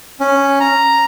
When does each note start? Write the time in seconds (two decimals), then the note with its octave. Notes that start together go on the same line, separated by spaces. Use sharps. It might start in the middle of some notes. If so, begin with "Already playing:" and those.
0.20 C#4
0.60 A#5